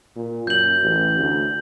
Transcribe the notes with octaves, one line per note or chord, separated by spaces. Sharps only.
A#2
F#2 G6 F#7
A1
D2